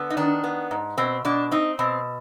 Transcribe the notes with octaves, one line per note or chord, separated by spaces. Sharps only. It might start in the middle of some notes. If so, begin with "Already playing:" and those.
Already playing: D3 B3
D#4
D#3 D4
B3
G#2
B2 C4
B2 D4
C4 D#4
B2 C4